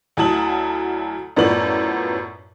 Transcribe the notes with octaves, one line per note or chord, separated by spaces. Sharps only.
D2 F#3 E4 A5 D#6 F#7
F#2 A2 F3 B3 D5 F#7